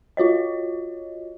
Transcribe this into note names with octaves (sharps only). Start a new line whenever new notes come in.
F4 F#4 C#5 D#5